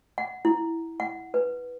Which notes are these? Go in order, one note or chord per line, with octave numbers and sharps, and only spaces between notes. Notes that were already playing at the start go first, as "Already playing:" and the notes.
F#5
E4
F#5
B4